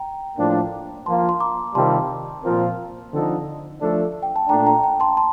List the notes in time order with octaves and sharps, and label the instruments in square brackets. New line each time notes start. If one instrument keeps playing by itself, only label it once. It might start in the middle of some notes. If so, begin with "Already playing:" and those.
Already playing: [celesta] G5 A#5
[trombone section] A2 F3 A#3 D4
[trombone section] F3 A#3 F4 [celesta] A5 C6
[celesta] C6
A#5 D6
[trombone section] C3 D#3 G3 C4 F4 [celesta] A5 C6
[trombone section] A#2 F3 C4 F4 A#4
D3 F3 C4 D#4 A4
F3 A3 D4 A4
[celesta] G5
A5
[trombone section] A#2 A3 D4 [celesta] G5 A#5
[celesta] G5 A#5
G5 A#5
A5 C6
A5 C6